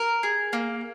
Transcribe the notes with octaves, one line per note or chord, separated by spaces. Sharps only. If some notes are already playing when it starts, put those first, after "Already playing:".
Already playing: A#4
G#4
A#3